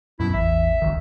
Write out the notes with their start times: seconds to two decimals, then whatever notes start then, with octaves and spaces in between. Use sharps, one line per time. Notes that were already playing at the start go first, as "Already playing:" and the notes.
0.20 F#2 B2 E4
0.34 A1 E2 E5
0.82 F1 C#2 D#3